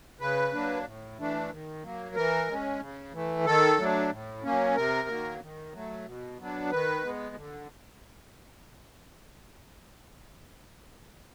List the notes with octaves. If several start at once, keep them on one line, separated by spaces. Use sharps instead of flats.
C#3 B4
F#3 A#3 D4
A2
E3 A3 D4
D#3
F#3 A#3
E3 A#4
G#3 C#4
C#3
E3 A3
D#3 A4
F#3 A3 D4
A2
F#3 A#3 C#4
C3 A#4
D#3 F#3 A#3
D#3
F#3 A3
B2
F#3 B3 D4
D#3 B4
G#3 B3
D3